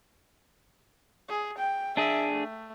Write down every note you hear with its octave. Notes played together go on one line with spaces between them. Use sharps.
G#4
G5
D4 G#4 E5
A3